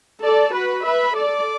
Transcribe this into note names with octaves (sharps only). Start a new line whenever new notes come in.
A4 D5 A5
F#4 B4 B5
B4 E5 B5
A4 D5 D6